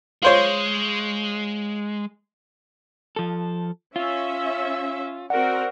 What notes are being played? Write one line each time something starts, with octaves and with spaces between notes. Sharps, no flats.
G#3 F4 C5 C#5
F3 A4
C#4 F4 E5
C4 F#4 A#4 D5 F#5